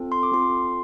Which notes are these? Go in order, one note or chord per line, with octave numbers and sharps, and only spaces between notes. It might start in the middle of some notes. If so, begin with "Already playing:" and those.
Already playing: C4 F4 A4
C6
D6
C4 F4 A4 C6